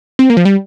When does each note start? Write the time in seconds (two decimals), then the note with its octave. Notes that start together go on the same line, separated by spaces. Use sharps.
0.19 C4
0.30 A#3
0.37 F3
0.45 G3